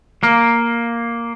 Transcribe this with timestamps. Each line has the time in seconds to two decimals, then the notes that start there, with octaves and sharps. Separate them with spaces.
0.23 A#3